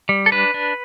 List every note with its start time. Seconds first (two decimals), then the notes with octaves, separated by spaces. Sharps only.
0.09 G3
0.26 A4
0.32 D4 B4
0.54 D4